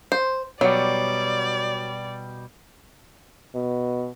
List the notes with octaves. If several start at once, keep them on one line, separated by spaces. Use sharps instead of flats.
C5
B2 F#3 G3 D5
B2